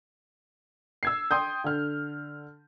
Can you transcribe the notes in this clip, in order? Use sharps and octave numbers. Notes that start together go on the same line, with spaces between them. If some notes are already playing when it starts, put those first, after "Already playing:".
E6 G#6 C7
G5 C6 D#6 G6
D3 F6